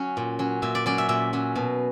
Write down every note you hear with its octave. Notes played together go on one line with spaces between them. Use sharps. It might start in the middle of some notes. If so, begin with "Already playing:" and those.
Already playing: F#3 C#4
A#2
F#3 C#4
A#2 E5
D5
F#3 C#4 D5
E5
A#2 E5
F#3 C#4
B2